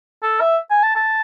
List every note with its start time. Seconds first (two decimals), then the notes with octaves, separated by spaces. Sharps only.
0.23 A4
0.40 E5
0.71 G#5
0.83 A5
0.96 A5